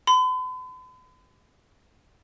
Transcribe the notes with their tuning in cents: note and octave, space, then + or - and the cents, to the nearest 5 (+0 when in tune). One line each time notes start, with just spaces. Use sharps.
B5 +45